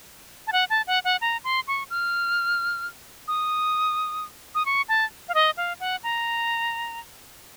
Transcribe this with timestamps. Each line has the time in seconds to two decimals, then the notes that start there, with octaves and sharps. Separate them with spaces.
0.47 A5
0.52 F#5
0.70 A5
0.87 F#5
1.04 F#5
1.21 A#5
1.44 C6
1.67 C#6
1.90 F6
3.28 D#6
4.55 D#6
4.66 C#6
4.89 A5
5.28 F5
5.35 D#5
5.57 F5
5.80 F#5
6.03 A#5